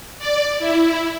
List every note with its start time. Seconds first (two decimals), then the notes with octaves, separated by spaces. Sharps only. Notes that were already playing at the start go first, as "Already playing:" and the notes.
0.19 D5
0.59 E4